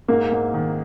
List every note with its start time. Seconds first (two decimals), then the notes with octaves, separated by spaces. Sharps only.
0.08 G#2 A#3
0.32 G#2
0.54 D#3